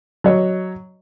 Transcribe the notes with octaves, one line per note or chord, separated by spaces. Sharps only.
F#3 C#5 D#5